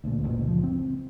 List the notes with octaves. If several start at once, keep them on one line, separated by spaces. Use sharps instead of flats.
D2 A#2
F#1 C#2 A#2
F3
C4